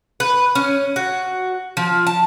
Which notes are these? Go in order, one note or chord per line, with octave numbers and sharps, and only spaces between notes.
B4
C#4
F#4
F3
A5